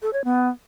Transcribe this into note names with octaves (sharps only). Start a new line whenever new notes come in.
A4
C#5
B3